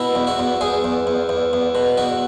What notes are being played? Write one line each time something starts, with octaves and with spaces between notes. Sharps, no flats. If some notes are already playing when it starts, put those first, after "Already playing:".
Already playing: B2 E4
E2
F#4
E2
E2 G#4
E2
E2
E2
E2
B2
E2 F#4